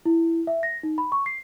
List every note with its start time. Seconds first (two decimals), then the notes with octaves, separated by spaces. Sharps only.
0.06 E4
0.47 E5
0.63 A#6
0.83 D#4
0.98 B5
1.12 C#6
1.26 C7